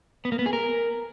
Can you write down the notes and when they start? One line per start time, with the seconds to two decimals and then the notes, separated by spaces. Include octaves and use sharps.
0.25 B3
0.32 A#3
0.39 B3
0.46 G#4
0.53 A#4